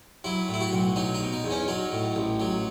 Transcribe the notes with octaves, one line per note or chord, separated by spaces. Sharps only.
F#3 E4
A2
E4
F#4
B1
F#3 D#4
D#4
B2
D#4
E2
C#4
F#3 D#4
A2
A1
F#3